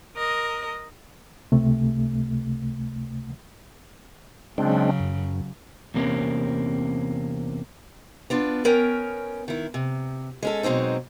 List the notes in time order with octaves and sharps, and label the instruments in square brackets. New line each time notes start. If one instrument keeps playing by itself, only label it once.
[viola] A#4 D#5
[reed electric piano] C#2 C3 A3
[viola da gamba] C#3 F#3 [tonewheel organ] G#3 C4 D4
[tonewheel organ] F#2
[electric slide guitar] E2 C3 A#3 C4 C#4
[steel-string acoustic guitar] B3 D4 F4
B3 C#4 A#4 C#5 G5
D#3 E4
C3
G#3 C#4 A4
B2 F#3 G#3 C4 D#4